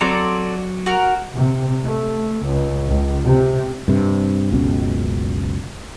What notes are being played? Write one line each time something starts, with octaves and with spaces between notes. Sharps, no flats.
F#3 C4 A4 D5 F#5 A#5
F#4 A#4
C3
A3
C#2
C#2
C3
G2 C3
F#1 C#2 B2 C#4